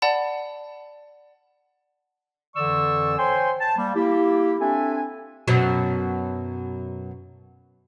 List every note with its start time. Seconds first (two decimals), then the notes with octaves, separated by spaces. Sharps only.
0.02 D5 F#5 A5 B5
2.56 F2 D3 E3 D5 C#6 E6
3.18 C5 C#5 G5 G#5 C6
3.59 A5
3.77 G3 A#3
3.95 A#3 E4 G4
4.60 C4 D4 A4 E5 G#5
5.48 F#2 B2 F#3